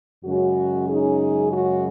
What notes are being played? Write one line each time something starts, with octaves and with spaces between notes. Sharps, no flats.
F#2 C#3 G#3 C#4 F#4
D#4 G#4
F#4